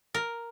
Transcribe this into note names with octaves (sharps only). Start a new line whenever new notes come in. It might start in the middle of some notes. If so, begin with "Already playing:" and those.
A#4